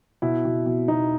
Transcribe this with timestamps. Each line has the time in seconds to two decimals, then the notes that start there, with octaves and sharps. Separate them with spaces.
0.22 B2 E4
0.45 B2
0.66 B2
0.88 B2 D#4